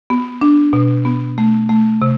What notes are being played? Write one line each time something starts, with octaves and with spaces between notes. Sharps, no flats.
B3
D4
B2
B3
A3
A3
C3